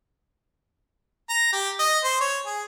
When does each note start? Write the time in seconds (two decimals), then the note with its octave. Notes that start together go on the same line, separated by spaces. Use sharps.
1.30 A#5
1.53 G4
1.79 D#5
2.04 C5
2.20 C#5
2.46 G#4